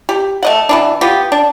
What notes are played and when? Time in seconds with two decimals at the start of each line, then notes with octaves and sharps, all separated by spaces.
0.09 G4
0.43 A3 D#5 F#5
0.69 B2 E3 D4
1.01 B3 F4 G4
1.32 D4